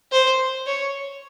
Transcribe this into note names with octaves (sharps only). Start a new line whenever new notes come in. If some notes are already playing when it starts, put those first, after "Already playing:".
C5
C#5